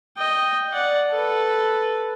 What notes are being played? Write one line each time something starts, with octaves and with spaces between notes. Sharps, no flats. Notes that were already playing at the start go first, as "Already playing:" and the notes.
D#5 G5
D5 F#5
A4 B4